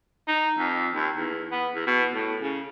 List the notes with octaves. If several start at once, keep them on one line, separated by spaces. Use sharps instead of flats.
D#4
F2
D#2
E2
B3
E2
B2
A2
C#3